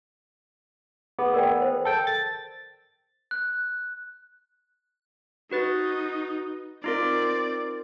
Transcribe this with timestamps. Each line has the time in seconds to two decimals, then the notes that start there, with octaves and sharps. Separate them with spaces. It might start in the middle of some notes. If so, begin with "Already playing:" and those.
1.19 B3 G#4
1.34 A#4 D5 G5
1.62 C5
1.85 A4 G5
2.07 A6
3.31 F#6
5.51 D#4 F#4 B4 A6
6.84 C4 D#4 F4 A#4 D5